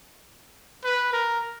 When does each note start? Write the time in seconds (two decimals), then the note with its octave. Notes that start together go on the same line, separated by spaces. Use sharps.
0.85 B4
1.13 A#4